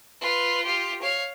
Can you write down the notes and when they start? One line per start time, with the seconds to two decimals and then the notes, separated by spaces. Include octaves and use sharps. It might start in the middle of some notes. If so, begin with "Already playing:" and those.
0.21 F4 B4
0.64 F4 G4
1.02 C#5 F5